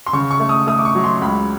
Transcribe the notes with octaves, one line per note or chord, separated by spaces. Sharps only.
C6
C#3 C#6
C#6
A3
D#6
A3 D#6
D6
C#6
F#3
C6
C#2 B5